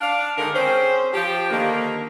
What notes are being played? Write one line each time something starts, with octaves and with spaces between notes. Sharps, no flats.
D4 F5
G#2 D3 D#3 A#4
C4 C#4 G#4 C5
F3 G4
D3 D#3 A#3